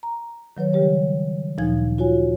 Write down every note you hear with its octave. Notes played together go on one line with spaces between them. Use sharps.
A#5
D#3 F#3 B4 C#5
C#3 G3 G4 C#5
D2 A#2 F3 D#4 G#5 G#6
F4 F#4 C#5 G#5